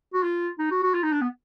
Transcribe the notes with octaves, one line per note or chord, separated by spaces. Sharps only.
F#4
F4
D#4
F#4
F#4
F4
D#4
D4
B3